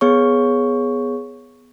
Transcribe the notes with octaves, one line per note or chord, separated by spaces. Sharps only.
B3 G#4 C#5 C#6